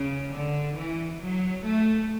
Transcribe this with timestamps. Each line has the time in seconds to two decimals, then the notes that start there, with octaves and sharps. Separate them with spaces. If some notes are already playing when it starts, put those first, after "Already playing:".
Already playing: C#3
0.33 D3
0.77 E3
1.20 F#3
1.64 A3